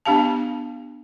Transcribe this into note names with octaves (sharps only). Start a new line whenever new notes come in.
B3 D4 G4 F5 A5